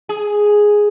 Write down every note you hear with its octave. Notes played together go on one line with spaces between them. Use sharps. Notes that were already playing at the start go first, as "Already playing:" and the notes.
G#4